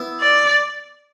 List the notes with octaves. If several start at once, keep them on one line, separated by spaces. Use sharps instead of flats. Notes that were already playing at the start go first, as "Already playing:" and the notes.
Already playing: B3 E4
D5